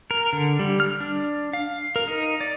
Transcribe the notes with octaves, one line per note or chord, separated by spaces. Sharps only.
A#4
D3
G3
F6
D4
F5
A#4
D#4
D5